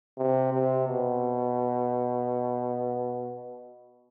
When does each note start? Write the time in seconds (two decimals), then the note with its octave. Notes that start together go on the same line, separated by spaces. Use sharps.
0.18 C3
0.53 C3
0.88 B2